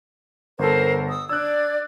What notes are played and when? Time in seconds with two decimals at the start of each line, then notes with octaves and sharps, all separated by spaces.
0.59 G1 A4 A#4 C5
1.10 D#6 E6
1.29 D4 D5 E6 F#6 G#6